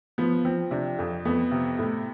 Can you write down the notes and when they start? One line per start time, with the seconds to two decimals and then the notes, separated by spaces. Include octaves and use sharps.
0.18 F3 B3
0.45 F3 C4
0.71 C3 D4
0.99 F2
1.25 F2 B3
1.51 C3
1.79 A2